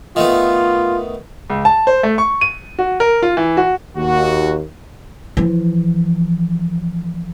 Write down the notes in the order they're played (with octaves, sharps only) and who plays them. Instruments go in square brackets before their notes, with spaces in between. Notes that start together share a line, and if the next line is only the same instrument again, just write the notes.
[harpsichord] D#3 A3 B3 [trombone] F4
[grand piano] C#2
A5
C5
A3
C#6
D#7
F#4
A#4
F4
E3
F#4
[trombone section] D#2 [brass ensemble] F#4
[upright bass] E3 F3